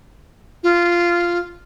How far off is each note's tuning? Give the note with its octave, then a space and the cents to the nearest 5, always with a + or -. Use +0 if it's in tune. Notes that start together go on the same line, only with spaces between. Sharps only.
F4 -10